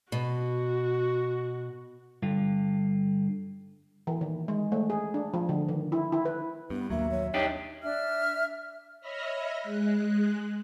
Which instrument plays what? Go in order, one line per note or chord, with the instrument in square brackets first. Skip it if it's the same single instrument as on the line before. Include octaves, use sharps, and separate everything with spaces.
[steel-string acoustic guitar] B2 [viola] F#4
[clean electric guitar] G2 D3 F4
[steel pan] E3
D#3
G#3
A3
G#4
D4
F3
D3
D#3
E4
E4
B4
[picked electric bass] G2 [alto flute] B3
[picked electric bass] A#1 D#2 F#3 [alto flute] A#3 [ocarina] E5
[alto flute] C#5
[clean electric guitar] D4 D#4 G4 [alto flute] C#5
[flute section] D4 E5 F6
[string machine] C#5 D#5 E5 B5 F6 A#6
G#3 F#6